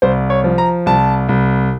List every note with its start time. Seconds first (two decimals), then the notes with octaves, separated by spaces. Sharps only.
0.02 C2 C5
0.30 C#5
0.44 F3
0.58 A#5
0.86 C2 A5
1.29 C2